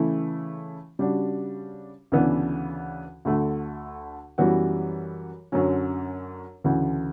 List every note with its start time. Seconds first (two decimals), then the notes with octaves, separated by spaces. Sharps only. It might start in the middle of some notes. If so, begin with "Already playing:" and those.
Already playing: C#3 E3 A3 E4
0.99 C#3 G3 D4 F#4
2.12 D2 C#3 E3 B3 D4
3.25 D2 D3 A3
4.38 F#2 E3 G3 B3 F#4
5.52 F#2 D3 F#3 C#4
6.64 D2 C#3 E3